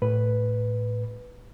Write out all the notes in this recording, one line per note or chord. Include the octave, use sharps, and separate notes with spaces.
A2 B4